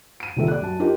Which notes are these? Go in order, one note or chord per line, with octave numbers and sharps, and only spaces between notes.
D7 D#7
C2 A#2 D#3 A4 E5
D5 F#6
F#2 A5
D#4 F4 G4 A#4 D#5